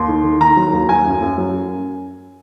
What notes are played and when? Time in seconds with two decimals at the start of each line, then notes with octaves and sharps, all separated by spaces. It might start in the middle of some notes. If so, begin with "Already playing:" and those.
Already playing: D#2 C6
0.08 D#3
0.24 D#3
0.40 D#3 A#5
0.57 F#3
0.73 D#2
0.89 F#3 G#5
1.05 F#2
1.22 F#2
1.38 F#3